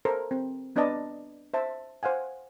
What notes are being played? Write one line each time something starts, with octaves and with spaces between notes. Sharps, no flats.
A4 A#4 C5
C4
B3 D4 B4 D5 D#5 A5
C5 E5 A5
C5 F5 F#5 G#5